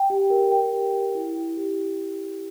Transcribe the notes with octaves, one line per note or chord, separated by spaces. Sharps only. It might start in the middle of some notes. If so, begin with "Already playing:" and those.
Already playing: G5
G4
A#4
G5
G4
A#4
E4
E4
G4